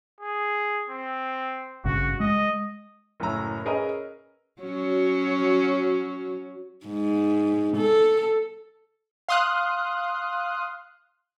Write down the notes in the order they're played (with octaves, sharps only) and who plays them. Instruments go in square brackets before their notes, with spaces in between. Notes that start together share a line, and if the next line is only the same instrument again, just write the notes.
[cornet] G#4
C4
[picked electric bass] G#1 G2 C#3 [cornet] F#4
[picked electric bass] G#3 [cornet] D#5
[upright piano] F#1 A2 C#4 A#5 E6
C#4 G#4 A#4 B4 D#5
[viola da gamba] F#3 C#4 F#4
G#2
A4
[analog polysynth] F5 C6 D#6 F6 F#6